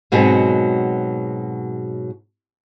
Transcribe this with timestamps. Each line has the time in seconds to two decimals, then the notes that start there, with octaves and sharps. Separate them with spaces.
0.12 G#2 B2 F#3 G#3 B3 C4